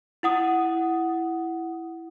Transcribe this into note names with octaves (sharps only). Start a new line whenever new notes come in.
E4 F#5 D#6